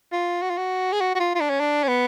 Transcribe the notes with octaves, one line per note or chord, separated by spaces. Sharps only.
F4
F#4
F4
F#4
G#4
F#4
F#4
F4
F4
D4
C#4
D4
C#4
B3